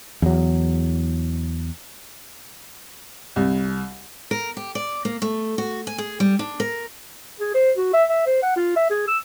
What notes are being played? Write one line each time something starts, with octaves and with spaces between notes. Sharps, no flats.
E2 F#3
C2
A#4
G4
D5
A#3
A3
F#4
G#5
G#4
G3
D4
A#4
G#4
C5
F#4
E5
E5
C5
F#5
F4
E5
G#4
E6